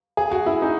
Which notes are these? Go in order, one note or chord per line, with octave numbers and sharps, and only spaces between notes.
G#4
F#4
E4
D#4